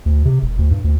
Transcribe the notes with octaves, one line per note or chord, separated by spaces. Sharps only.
D2
C3
E1
D2
G2
D2